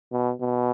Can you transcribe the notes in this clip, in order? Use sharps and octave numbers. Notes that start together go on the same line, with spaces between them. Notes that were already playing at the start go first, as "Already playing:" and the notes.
B2
B2